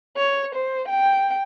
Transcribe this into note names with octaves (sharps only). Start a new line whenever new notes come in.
C#5
C5
G5